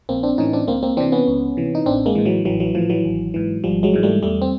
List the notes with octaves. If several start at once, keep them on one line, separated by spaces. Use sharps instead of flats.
A#1 A#3 C4
C4 D4
A2 E3 C#4 D#4
C4 D4
C#2 A#3 C4
A#3 C4
C3 E3 C4 D4
B3 C#4
C#2
C3 E3
D#4
A1 C4 D4
G#3 A#3
E3
A2
E3 F#3
A1 E3 F#3
E3 F#3
A2 E3 F3
E3 F#3
G#1
G#2 E3
G#1 F3 G3
F#3 G#3
G#2 E3
G3 A3
E2 G3 A3
C4